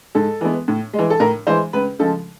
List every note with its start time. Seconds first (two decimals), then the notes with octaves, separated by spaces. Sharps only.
0.15 G#2 A4
0.41 E3 G#3 B3
0.68 A2
0.93 G#3
0.99 E3
1.10 A4
1.20 A2 A#4
1.47 E3 G#3 C5
1.73 C#2 B4
1.99 C#3 F3 G#3 A4